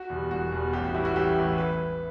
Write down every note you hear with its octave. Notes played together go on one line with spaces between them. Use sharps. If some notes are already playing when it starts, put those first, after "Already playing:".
Already playing: F#4
E2 B2 G3
E1 F#4
E2 B2 G3
A1 G4
F#4
A2 E3 G3 E4
F#4
A1 G4
A2 E3 G3
B4